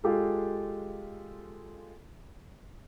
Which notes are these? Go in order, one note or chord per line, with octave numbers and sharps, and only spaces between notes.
G#3 F4 G4 A4